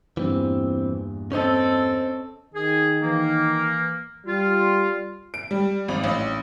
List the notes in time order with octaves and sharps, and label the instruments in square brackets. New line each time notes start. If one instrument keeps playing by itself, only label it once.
[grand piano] E2 G2 A#2 [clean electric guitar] E3 C4
[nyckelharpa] C4 A4 [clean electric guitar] C#4 C5 D#5
[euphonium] D#3 [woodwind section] G#4
[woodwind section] E3 A#3
[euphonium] G3 [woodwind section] F4
[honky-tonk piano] D7
G3
G#1
A1